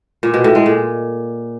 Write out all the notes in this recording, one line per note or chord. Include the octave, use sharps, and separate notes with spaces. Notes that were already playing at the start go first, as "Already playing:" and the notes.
A#2
B2
A2
G#3
A#2